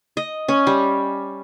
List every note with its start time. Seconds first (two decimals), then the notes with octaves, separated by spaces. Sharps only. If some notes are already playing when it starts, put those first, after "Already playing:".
0.17 D#5
0.48 C#4
0.67 G3